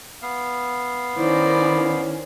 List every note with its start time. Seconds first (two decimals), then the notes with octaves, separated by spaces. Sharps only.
0.22 B3 F5
1.17 D#3 C#4 E4 C5 D5